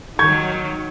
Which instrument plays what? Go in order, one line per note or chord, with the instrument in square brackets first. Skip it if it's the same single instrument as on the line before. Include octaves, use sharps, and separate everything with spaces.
[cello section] D#3 F#3 [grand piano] C#6 G6 G#6